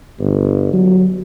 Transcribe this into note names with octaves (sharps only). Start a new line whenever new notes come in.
G1
F#3